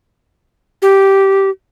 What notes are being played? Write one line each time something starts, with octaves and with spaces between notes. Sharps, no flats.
G4